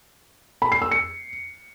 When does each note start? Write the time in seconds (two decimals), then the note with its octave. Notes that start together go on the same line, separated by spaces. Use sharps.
0.62 B5
0.72 C7
0.82 E6
0.91 C#7